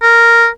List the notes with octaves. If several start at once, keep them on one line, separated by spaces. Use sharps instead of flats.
A#4